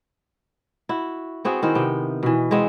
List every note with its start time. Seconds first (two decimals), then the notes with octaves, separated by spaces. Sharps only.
0.89 E4 F#4
1.45 B3 C4 F#4 G#4
1.63 D#3 C4 E4
1.75 C3 B3 G5
2.23 B2 E3
2.51 G#3 B3 C4